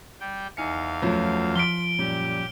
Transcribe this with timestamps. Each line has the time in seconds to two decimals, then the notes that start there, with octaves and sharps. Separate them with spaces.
0.20 G3 G5
0.57 E2 D#4 F5 G#5 C#7
1.02 F#2 F3 F#3 A3 F4 B4
1.56 F3 C6 F6 B6 D7 G7
1.99 F#2 A#2 G3 G4